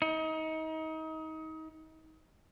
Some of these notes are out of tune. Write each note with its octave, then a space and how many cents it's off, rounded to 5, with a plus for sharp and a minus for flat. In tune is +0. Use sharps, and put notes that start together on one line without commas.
D#4 +30